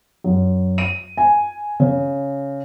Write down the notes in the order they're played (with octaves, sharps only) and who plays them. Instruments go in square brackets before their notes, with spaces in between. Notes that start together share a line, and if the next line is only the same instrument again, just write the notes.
[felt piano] F#2
D#7
G#5
C#3